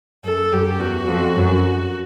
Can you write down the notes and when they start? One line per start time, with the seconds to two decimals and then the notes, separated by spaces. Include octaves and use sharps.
0.24 F#2 A4
0.52 F#2 G4
0.80 E2 F#4
1.08 F2
1.36 F#2